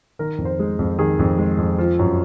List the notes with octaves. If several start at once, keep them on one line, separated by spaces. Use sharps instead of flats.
D#3 A#4
F2
C5
G#3
F2
D#3 G#4
F2
G#3
F2
F3
F#2